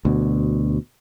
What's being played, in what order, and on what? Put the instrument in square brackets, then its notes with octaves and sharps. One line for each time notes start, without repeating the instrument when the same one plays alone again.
[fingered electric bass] D2 B2